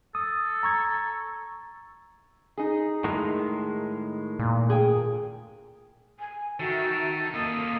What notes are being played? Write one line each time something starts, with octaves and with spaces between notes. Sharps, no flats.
A4 D#6
A#5 C#6 G#6
D#4 G#4
A2 D#3 G#3
A#2
G#4 G5
G#5
D#3 F#4 A4 E5
A#3 F4 D#5 D#6